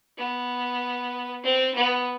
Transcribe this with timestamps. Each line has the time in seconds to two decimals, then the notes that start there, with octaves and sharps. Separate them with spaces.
0.18 B3
1.44 C4
1.75 B3